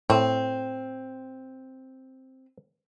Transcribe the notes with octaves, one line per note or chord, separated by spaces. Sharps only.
A2 C4